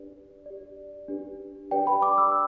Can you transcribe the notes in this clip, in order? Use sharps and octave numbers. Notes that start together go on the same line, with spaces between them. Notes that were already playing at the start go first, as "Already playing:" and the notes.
Already playing: D4 G4 B4 D5
G4 D5
D4 G4 B4
D4 G4 B4 D5 G5
B5
D6
E6